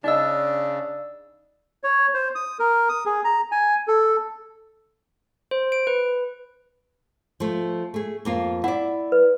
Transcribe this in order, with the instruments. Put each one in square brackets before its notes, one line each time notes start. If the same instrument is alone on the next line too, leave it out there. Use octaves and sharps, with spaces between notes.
[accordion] C#3 [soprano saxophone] D4 [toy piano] D#4 D#5 [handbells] D5 E6
[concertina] C#5
C5
D#6
A#4
D#6
G#4
A#5
G#5
A4
[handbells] C5
D7
B4
[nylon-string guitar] F3 A3
A3 G#4
F2 A#3 F4
[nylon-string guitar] E4 D5 [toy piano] F#5
[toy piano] B4